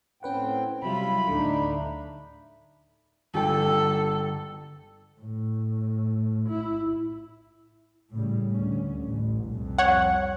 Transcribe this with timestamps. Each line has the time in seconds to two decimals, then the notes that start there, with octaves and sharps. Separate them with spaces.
0.23 A2 C4 C#4 B4 F#5 G5
0.82 C3 F#3 G3 E4 F4 B5
1.28 D2 A2 D3 A3 D4 D#4
3.34 G1 A4 G5
5.20 A2
6.49 E4
8.12 A2 C#3 G3
8.52 D2 C#4
9.08 A1
9.49 C2 F2
9.78 C#5 F#5